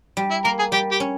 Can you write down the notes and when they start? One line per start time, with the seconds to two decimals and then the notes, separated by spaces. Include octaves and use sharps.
0.17 G3
0.31 E4
0.44 A#3 A#4
0.59 G#4
0.72 G3 G4
0.91 G4
1.00 C#4